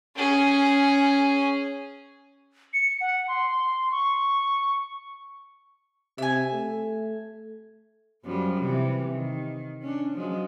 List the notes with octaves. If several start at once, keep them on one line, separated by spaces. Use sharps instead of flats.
C#4 G#4
C#7
F#5
C6
C#6
C3 E5 G#5
A3
F#2 F3 G3
C3 E3
D#3
C#4 D4
F3 F#3 G#3